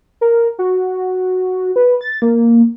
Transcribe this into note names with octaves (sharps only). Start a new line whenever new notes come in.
A#4
F#4
B4
A6
A#3